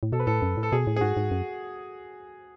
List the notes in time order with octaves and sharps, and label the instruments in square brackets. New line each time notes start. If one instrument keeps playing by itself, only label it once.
[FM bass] A2
[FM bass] B2 [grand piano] A4
[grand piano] B4
[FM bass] A2 [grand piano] A4
[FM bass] F#2
A2
[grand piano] A4
[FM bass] B2 [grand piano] G#4
[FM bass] A2
[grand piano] G#4
[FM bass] G#2 [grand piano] F#4
[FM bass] G#2
F#2